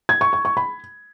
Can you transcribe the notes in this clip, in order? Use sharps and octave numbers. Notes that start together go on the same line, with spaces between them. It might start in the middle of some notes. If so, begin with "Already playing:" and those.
G#6
C#6
C#6
C#6
B5